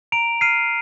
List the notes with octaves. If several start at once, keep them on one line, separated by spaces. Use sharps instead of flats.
A#5 D7 F7
F6 C7 D#7